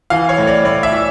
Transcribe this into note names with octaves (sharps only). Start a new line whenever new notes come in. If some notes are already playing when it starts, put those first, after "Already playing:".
E3 F5
C#5
A2
D5
A2 D5
E5
E3